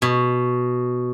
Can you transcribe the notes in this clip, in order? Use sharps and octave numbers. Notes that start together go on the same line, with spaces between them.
B2